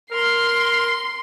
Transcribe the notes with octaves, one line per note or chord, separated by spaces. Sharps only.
A#4 C6 C7